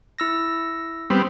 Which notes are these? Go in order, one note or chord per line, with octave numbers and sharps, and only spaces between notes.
E4 E6 A#6
G3 B3 C4